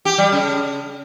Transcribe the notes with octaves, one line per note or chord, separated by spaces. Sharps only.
G4
G3
C#3